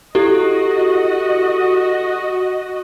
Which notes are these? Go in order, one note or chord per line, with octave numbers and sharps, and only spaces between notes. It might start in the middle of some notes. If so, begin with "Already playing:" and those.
E4 F#4 G4 A4 D#5